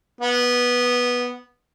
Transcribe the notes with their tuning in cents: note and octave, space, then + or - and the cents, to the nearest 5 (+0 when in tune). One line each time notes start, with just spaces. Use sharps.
B3 -10